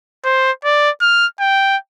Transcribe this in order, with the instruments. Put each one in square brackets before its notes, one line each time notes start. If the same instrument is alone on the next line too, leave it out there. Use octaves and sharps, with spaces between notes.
[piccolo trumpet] C5
D5
F6
G5